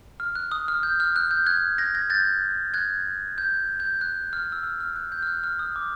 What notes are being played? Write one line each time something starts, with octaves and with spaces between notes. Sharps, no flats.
F6
F#6
D#6
F6
G6
F6
F#6
G6
F#6 G#6
G#6 A#6
G#6 A#6
G6 A6
F#6 G#6
G6
G6
F#6
F6
E6
F6
F6
F#6
G6
F6
F#6
F6
D#6
D6